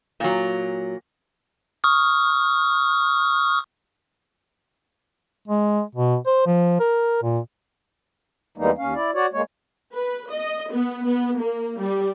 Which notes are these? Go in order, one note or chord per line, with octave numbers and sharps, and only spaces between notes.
A#2 F#3
C#6 D#6 F6
G#3
B2
C5
F3
A#4
A#2
E2 E3 G3 G#3 A#3 D#4
D#2 C#4 F5
E4 D5
F#4 C#5 D5
G#3 A#3 C#5
B4
D#5
B3
B3
A#3
G3